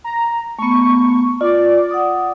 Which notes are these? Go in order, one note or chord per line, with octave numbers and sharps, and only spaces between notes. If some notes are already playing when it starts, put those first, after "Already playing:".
A#5
A3 B3 C#6
F4 D5
F#5 D#6